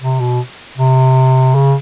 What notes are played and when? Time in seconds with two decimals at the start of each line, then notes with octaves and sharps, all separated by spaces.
0.01 C3
0.20 B2
0.78 C3
1.55 C#3